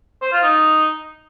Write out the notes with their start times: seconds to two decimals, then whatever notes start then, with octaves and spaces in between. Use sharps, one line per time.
0.22 C5
0.32 F4
0.43 D#4